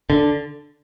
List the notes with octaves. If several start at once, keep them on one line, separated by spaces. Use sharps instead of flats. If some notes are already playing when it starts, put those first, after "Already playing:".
D3